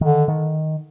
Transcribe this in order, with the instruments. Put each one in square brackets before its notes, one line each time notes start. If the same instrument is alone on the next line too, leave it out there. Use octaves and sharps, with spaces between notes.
[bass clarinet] D3 [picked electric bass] D#3
[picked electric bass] D#3